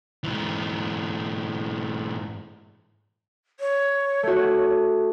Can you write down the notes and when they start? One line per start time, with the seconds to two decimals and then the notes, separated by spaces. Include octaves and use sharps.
0.24 G#2 E3
3.60 C#5
4.23 A3 F#4